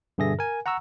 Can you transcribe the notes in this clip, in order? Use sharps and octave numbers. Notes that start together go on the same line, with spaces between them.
G2 B2 D3 G#4 E5 A#6
A#4 G#5
F#5 A#5 C#6 E6